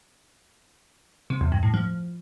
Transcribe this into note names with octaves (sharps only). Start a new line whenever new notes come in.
C3
E2
G2
A2
F3